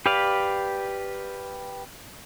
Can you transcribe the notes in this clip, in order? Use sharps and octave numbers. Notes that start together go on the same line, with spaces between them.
G4 B4 D5 F5